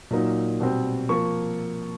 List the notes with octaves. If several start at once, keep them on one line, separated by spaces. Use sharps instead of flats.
A#2 F#3 A#3 D#4
B2 G3 C4
F3 A#3 C#6